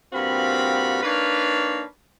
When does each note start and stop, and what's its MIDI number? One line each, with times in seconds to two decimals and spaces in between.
0.13 0.98 43
0.13 0.98 46
0.13 0.98 60
0.13 0.98 66
0.13 0.98 77
0.13 0.98 83
1.03 1.82 58
1.03 1.82 62
1.03 1.82 63
1.03 1.82 71
1.03 1.82 73
1.03 1.82 77